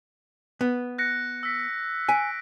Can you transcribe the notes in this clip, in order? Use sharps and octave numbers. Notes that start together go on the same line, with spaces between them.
B3
F#6 A#6 C#7
E6 B6
G#5 B6 D7